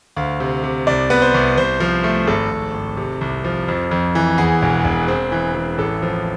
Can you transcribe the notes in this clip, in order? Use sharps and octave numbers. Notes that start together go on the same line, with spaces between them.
D2 F5
C3
C3
C2 D5
B3 B4
C5
C2
C2 C5
F3
A3
G#1 A4
G#1
G#1
C3
C2
F3
F2
F2
E3
E2 G#4
E1
E1
C4
E3
E3
A1 A4
F3